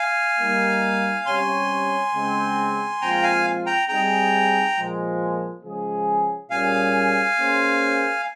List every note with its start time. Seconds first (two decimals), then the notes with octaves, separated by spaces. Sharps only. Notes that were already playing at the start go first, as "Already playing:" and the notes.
Already playing: F5 G#5
0.40 G3 A#3 D#4
1.26 C3 G3 C#4 G4 C#5 G#5 C6
2.14 C#3 G#3 C4
3.01 A#2 F3 G#3 C4 F4 G5 A#5
3.23 F5 G#5
3.66 G5 A#5
3.88 G3 C4 D#4 G#4 G5 A#5
4.76 A#2 F3 G#3
5.63 C#3 F3 G#3 C#4 G#4
6.50 A#2 G3 C#4 G#4 F5 G#5
7.38 A#3 C#4 G#4 C5